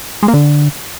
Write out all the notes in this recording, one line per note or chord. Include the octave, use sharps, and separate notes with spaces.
G#3
A#3
D3